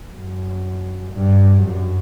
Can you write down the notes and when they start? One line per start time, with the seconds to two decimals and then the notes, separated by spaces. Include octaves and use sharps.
0.13 F#2
1.13 G2
1.63 F#2